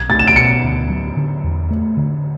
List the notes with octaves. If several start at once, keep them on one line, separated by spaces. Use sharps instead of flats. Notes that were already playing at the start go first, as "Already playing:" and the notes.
Already playing: B1 G#6
A3 A6
E7
D7
B2 C#7
D2
F#3
D3
E2
A3
D3